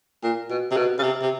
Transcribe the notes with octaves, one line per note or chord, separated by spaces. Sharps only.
A#2
B2
C3
B2
C#3
C3
C3